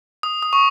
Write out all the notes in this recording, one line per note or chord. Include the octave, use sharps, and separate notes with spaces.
D#6
D#6
C#6